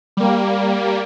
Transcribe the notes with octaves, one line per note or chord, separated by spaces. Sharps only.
G3 A#3